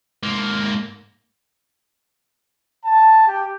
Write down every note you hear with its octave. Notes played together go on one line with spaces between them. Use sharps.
G#2 A#3
A5
G4